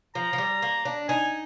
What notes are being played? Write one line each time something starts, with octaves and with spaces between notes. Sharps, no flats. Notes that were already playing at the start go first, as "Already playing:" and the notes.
F3 A#5
F3
G3
A#3
D4
D#4 G#5